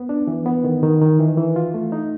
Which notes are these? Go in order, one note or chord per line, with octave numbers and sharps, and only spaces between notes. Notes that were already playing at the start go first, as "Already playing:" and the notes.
Already playing: B3
D4
E3
B3
D#3
D#3
D#3
E3
E3
F4
A3
D#4